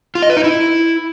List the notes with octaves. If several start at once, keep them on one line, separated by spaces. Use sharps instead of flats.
F4
D#5
B4
D#4
E4